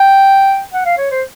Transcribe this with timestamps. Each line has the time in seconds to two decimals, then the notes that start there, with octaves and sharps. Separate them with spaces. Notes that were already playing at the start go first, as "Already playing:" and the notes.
Already playing: G5
0.73 F#5
0.85 F5
0.98 C#5
1.11 C5